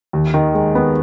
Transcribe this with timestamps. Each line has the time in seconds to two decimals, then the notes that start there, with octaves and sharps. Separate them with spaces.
0.13 D#2
0.34 D#3
0.54 G#3
0.75 B3